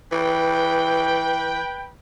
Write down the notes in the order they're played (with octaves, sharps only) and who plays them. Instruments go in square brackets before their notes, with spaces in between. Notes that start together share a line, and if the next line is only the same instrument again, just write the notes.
[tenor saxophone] E3 [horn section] B4 G5